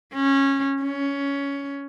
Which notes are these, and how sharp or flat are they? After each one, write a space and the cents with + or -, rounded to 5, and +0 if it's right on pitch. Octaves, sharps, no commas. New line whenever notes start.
C#4 -15
C#4 +15